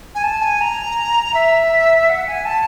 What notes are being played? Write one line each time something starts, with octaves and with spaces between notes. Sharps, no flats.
G#5
A5
G#5
A#5
E5
F#5
G#5
A5